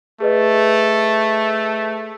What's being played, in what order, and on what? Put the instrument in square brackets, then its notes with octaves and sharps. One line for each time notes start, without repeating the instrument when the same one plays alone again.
[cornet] A3 [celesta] G#4 B4 D#5